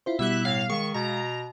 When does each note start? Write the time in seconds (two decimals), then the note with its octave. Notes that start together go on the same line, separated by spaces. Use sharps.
0.06 E4 F4 C5
0.19 B2 G3 E4 E5 F#6
0.45 A2 F5
0.70 D#3 G#3 F5 C#6
0.94 B2 A#5